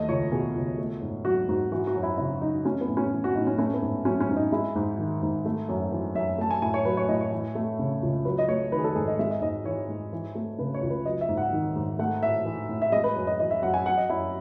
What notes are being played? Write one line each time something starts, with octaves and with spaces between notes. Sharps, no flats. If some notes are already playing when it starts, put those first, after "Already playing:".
Already playing: D#2 A3 D#5
C#2 C#5
B2 G#4
C#2
A3
G#2
F#3 F#4
G#2 F#4
E3 F#4
F#4
F#2
E4
C#3 E4
F#2 D#4
A3 C#4
B3
A2
C#4
E3
F#4
A2 D#4
C#4
A3 C#4
B3
G#2
F#3 C#4
C#4
G#2
D#4
G#3 E4
G#2
D#3
G#2
A3
F#2
E3
F#2 E5
A3 A5
G#5
A2 G#5
C#5
F#3 B4
C#5
A2 D#5
C#5
E3
A3
C#3
C#2
F#3 B4
D#5
A3 C#5
D#3 B4
G#4
A4
G#2 G#4
D#5
G#3 E5
D#5
G#2 D#5
E3 C#5
G#2
E3
A3
C#3 B4
C#5
C#2
B4
F#3 D#5
E5
G#2
F#5
D#3
G#2
A3 F#5
A2 E5
E3
A2
E5
G#3 D#5
B4
F#2
D#5
E3 D#5
E5
F#2 F#5
G#5
F#3 F#5
D#5
F#2 E4